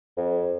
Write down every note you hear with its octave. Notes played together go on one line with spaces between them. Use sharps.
F2